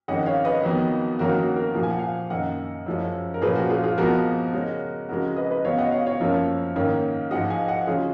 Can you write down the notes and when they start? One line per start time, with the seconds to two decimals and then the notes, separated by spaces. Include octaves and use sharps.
0.08 F2 D#3 G#3 C#4 D#5 F#5
0.26 C#5 F5
0.45 B4 D#5
0.63 F2 D#3 F#3 B3
1.19 F2 D#3 F#3 A#3 C#4 F#4 A#4
1.38 F#4
1.56 F#4 A#4
1.74 A#2 F3 A#3
1.83 G#5
1.91 F#5
1.99 F5 G#5
2.30 F#2 D#3 A#3 D#5 F#5
2.86 F#2 F3 G#3 C#4
3.34 A#4
3.42 A#2 F3 A#3 C#4 G#4 B4
3.55 F#4
3.70 F4 G#4
3.84 F4 G#4
3.98 F2 F3 G#3 B3 F#4 A#4
4.53 C#3 G#3 C#4
5.09 F2 C#3 G#3 F#4 A#4
5.36 B4 D#5
5.51 B4 D#5
5.64 C#3 F#3 B3 C#5 F5
5.78 D#5 F#5
5.92 C#5 F5
6.06 C#5 F5
6.20 F#2 F3 A#3 C#4
6.76 G#2 D#3 A#3 C#4
7.31 G#2 F3 G#3 D#5 F#5
7.50 F5 G#5
7.68 D#5 F#5
7.87 C#3 F#3 C#4 F4 G#4